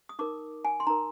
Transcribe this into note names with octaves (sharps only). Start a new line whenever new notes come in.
D#6
D#4 A#4 D6
G#5
C6
D#4 A#4 A#5